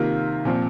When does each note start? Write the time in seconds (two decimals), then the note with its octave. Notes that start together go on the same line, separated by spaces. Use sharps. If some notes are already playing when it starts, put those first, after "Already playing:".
Already playing: C3 D#3 A#3 F4
0.45 A#2 F3 C4